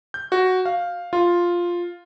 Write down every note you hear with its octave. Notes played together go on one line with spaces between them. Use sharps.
G6
F#4
F5
F4